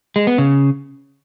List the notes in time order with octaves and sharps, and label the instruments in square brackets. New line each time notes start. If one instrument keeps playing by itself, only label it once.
[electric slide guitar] G#3
B3
C#3